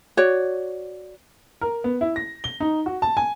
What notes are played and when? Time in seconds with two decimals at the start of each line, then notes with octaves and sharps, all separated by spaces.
0.17 F#4 C#5 D5
1.61 A#4
1.84 B3
2.01 E4
2.16 A#6
2.44 G7
2.60 D#4
2.86 F#4
3.02 A5
3.17 G#5